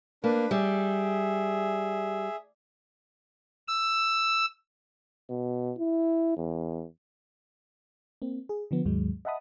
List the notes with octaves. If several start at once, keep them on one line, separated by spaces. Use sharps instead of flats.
A#3 D4 B4
G3 G#4 E5
E6
B2
E4
E2
A#3 C4
G#4
D3 F3 B3
D#2 G#2 F#3 G#3
D#5 E5 F#5 A5 B5 D#6